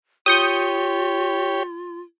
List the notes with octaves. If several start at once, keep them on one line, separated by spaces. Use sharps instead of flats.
F4 G4 C#5 D#6 G6 C#7